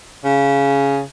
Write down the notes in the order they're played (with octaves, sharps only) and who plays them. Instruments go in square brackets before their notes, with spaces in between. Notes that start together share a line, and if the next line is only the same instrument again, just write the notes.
[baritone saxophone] C#3